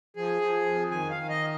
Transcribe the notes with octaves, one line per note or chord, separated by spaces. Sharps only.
F3 G#4
F3
F2
D#3 G#5
F5
D#3
D#5